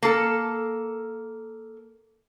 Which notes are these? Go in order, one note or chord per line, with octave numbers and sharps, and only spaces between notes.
A#3 A4